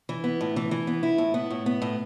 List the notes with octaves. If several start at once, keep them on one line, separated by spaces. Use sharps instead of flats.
E3
B3
A2
E3
E3
B3
E4
A2
B3
A2
B3
A2